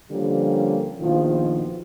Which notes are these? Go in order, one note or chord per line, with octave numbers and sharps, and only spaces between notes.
D3 F3 G3 A#3 C#4 G4
A#1 B2 D#3 F3 F4